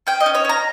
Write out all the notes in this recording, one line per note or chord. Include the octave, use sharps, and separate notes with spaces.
C#4 G5
D#5
C#4
C#5
C#4 A#5